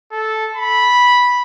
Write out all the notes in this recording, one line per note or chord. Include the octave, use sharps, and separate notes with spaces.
A4
B5